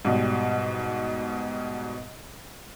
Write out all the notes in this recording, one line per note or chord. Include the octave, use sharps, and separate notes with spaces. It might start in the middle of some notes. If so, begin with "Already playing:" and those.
G#2 B2 G3